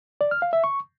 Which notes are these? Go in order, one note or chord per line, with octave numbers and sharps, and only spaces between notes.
D5
F6
F5
E5
C#6